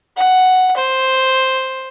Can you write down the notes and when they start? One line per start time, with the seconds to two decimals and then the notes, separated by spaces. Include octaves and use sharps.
0.18 F#5
0.77 C5